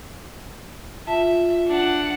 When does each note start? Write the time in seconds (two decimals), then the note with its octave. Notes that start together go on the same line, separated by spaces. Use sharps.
1.07 F4 E5 A5
1.68 D4 F#5